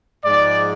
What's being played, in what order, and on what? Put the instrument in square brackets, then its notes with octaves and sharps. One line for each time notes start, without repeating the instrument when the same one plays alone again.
[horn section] G#2 F3 G#3 D5